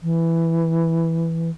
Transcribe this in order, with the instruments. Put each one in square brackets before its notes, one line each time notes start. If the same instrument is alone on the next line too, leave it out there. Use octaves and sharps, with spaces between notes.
[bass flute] E3